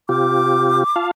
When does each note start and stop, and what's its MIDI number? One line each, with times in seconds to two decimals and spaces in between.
0.09 0.84 48
0.09 0.84 65
0.09 0.84 67
0.09 1.06 86
0.96 1.11 65
0.96 1.11 77
0.96 1.11 81